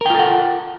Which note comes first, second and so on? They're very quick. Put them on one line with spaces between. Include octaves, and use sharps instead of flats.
A#4 G5 F4 A4 F#5